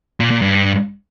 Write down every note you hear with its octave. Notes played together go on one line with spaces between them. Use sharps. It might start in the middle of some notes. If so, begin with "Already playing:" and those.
A#2
A#2
G2